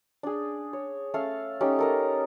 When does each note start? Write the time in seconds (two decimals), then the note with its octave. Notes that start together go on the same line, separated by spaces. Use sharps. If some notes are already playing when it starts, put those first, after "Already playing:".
0.23 D4 G#4
0.73 C#5
1.14 A3 C#4 A4 F5
1.61 A3 C#4 D#4 G4
1.79 A4 A#4 D#5